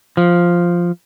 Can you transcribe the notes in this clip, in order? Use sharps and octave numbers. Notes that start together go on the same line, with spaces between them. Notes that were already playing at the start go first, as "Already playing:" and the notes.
F3